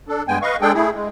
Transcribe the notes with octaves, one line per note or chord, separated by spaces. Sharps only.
D4 A4
G2 G#3 B3 G5 G#5
B4 D#5 F5 C#6
G#3 D4 G#4 A4 G5
A3 E4 G#4
G#3